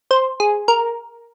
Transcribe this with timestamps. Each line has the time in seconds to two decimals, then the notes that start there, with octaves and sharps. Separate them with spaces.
0.11 C5
0.40 G#4
0.68 A#4